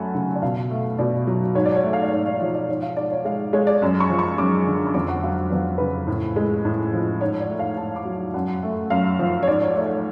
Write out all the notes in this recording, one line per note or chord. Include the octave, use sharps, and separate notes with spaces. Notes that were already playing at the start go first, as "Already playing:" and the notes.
Already playing: F#2 F#3 A3 F#5 G#5 A5 B5
C#3
D5
B2 F5
A3
B2 D5
F#3
G#2 C#5
D5
C#5
A3
F5
D5
G#2 C#5
D5
F3 C#5
D5
G#2 C#5
F5
G#2 D5
C#5
G#3 F5
G#3 C#5
D5
F#2
C#6
F3
C#6
F#2 D6
D3
C#6
F2 D6
F#5
F#3 F5
F2 B4
C#3 B4
A2
G#3
A2
F3
G#2 C#5
D5
A3
F5
G#2 A5
D6
F#3
F#2 F#5
A3
F#2 F5
F3
C#5
G#2 D5
C#5
D5
A3 C#5